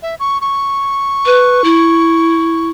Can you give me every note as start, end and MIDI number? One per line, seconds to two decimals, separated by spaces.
0.03 0.15 76
0.20 0.41 85
0.41 2.69 85
1.26 1.62 71
1.64 2.71 64